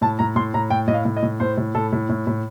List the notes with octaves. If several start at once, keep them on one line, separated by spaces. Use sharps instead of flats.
A2 A5
A2 A#5
A2 C6
A2 A#5
A2 G5
A2 D#5
F5
A2
D#5
A2
A2 C5
A2
A2 A4
A2
A2
A2